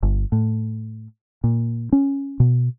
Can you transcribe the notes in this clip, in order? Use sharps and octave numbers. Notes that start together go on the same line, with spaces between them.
G1
A2
A#2
C#4
B2